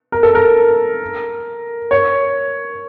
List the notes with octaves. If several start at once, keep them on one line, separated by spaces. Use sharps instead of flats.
A#4
A4
A#4
C#5